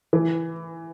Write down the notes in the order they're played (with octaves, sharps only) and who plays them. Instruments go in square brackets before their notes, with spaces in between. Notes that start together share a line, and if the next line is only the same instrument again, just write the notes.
[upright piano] E3